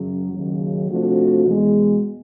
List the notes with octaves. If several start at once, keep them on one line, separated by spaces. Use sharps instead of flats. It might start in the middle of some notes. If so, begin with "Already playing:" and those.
Already playing: F#2 C#3 F#3
D#2 C#3 F#3
C3 F3 A3 D4 F#4
E2 B2 G#3